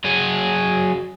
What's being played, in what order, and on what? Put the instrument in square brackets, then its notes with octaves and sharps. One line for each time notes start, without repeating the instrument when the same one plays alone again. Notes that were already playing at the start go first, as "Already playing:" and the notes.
[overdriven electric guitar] F#3 G#4